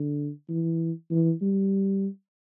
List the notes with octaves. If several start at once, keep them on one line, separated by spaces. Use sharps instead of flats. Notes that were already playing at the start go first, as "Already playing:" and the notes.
Already playing: D3
E3
E3
G3